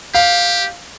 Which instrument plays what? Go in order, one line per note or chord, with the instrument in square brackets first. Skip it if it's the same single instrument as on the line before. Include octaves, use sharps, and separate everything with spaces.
[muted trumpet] G4 [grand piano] F5